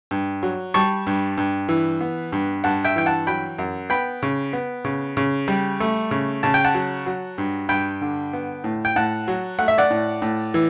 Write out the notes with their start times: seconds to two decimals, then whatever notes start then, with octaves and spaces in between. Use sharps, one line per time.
0.11 G2
0.43 F#3
0.74 G3 A5 C#6
1.07 G2
1.38 G2
1.69 E3
2.01 B3
2.32 G2
2.64 G2 F#5 A5
2.84 E5 G5
2.96 E3 G5
3.06 F#5 A5
3.27 F#3 G5 B5
3.59 F#2
3.90 B3 G5 B5
4.23 C#3
4.53 B3
4.85 C#3
5.17 C#3
5.48 G3
5.80 A3
6.11 C#3
6.43 C#3 A5
6.54 G5
6.65 F#5 A5
6.74 F#3
7.06 F#3
7.38 G2
7.69 G2 G5 B5
8.01 D3
8.33 B3
8.64 A2
8.85 G5
8.96 A2 F#5 A5
9.28 F#3
9.59 A3 F#5
9.68 E5
9.78 D5 F#5
9.90 A2
10.22 A2
10.54 E3